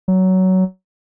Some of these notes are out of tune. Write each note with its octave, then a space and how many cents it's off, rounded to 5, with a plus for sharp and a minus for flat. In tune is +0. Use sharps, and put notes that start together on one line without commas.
F#3 +15